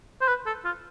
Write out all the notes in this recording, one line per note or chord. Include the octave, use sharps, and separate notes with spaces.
C5
B4
A4
F4